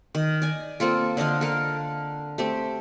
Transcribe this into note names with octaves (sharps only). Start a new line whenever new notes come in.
D#3
D5 G#5
A#3 C4 F4 A4
D3 D4 D#5 F5
A4 A#4 F5
A3 C4 G4